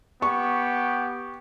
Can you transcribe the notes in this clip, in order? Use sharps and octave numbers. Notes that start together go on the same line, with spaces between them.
B3 G4 C#6